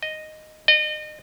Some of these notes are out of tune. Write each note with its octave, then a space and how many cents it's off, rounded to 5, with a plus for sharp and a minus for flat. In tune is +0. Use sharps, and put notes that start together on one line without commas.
D#5 -5
D#5 -35